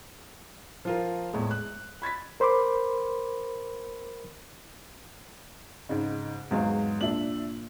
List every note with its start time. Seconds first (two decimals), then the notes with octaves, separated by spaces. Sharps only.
0.85 F3 F4 A#4
1.34 E2 A2 G#3
1.51 F#6
2.02 B5 G#6 A6 B6
2.40 A#4 C5 B5 C6 D6
5.89 G#2 C#3 D#4
6.51 E2 G#2 F#3 G#3 F5
7.01 A#2 D4 E5 F#7